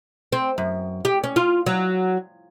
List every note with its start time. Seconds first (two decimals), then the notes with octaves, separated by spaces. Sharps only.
0.32 C4
0.58 F#2
1.05 G4
1.24 C#4
1.36 F4
1.66 F#3